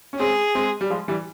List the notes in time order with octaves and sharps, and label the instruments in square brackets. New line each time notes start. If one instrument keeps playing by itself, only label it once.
[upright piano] C#4
[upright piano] G#3 C4 [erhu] G#4
[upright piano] G#3 C4
G3
F3 G#3
E3 G3